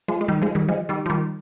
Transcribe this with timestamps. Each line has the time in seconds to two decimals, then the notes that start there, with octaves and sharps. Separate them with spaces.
0.08 F3 G#3
0.21 G#3
0.28 D#3 G3
0.42 F3 G#3
0.55 D#3 G3
0.69 F3 G#3
0.89 D#3 G3
1.06 F3
1.10 D#3 G3